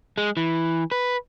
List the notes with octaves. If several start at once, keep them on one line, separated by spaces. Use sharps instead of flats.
G#3
E3
B4